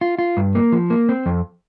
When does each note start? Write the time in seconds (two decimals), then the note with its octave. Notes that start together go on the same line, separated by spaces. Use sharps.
0.01 F4
0.19 F4
0.37 G2
0.55 A#3
0.72 F3
0.90 A#3
1.09 C4
1.26 F2